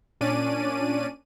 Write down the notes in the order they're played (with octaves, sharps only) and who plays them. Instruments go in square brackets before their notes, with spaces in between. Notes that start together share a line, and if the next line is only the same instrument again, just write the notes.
[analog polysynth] A#2 C#4 D4 D5 D#7